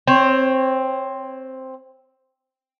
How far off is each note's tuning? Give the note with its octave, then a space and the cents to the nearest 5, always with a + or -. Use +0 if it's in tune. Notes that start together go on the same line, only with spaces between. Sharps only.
C4 +5 C#5 -20